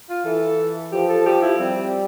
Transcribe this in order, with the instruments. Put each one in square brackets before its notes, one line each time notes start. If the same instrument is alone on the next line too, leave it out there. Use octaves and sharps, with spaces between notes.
[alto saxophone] F4
[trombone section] E3 [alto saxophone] A4
[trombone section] F3 [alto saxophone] G4
[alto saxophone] A4
G4
E4
[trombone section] G3 [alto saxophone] C4